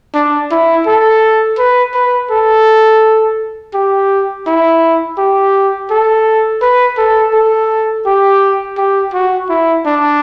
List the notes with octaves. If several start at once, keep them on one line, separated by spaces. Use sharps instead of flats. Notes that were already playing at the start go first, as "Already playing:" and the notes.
D4
E4
A4
B4
B4
A4
G4
E4
G4
A4
B4
A4
A4
G4
G4
F#4
E4
D4